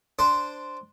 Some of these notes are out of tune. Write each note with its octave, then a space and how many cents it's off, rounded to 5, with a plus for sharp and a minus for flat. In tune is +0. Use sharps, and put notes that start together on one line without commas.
D4 +0 C5 -5